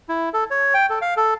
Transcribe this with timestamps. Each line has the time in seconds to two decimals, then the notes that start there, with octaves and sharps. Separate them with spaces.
0.09 E4
0.34 A4
0.50 C#5
0.74 G5
0.90 A4
1.02 F5
1.17 A4